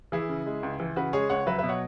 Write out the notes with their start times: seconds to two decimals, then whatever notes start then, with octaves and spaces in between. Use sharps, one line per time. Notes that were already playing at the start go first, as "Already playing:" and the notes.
0.12 E3 E4 G#4
0.29 C#3
0.46 G#3
0.63 C#2
0.80 E3
0.96 C#3 F#4 B4
1.13 G#3 G#4 C#5
1.29 C#2 C#5 F#5
1.47 F#3 B4 E5
1.58 B2 B4 E5
1.69 C#5 F#5